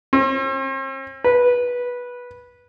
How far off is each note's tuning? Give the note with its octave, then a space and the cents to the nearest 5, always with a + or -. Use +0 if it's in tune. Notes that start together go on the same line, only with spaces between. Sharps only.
C4 +45
B4 -15